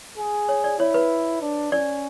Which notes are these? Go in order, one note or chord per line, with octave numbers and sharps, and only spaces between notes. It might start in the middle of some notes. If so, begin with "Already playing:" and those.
G#4
C#5
D5
E4 C#5
B4
D4
C#4 D5